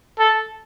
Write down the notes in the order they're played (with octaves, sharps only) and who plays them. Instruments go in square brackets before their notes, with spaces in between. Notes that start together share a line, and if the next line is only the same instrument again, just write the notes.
[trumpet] A4